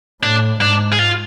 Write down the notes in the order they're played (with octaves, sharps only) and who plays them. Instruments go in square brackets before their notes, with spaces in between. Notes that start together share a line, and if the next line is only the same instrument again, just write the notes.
[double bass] A2 [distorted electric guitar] D4
[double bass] G#2 [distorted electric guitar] D4
[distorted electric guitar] G#4
F4